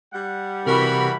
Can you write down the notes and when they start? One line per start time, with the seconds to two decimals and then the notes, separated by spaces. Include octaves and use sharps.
0.13 G3 F#5
0.66 C3 E3 F#4 A#4 B5